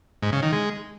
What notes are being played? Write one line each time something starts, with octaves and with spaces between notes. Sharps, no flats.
G#2
C#3
D#3
G#3